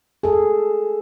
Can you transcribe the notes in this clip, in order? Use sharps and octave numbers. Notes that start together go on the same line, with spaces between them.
G#4 A4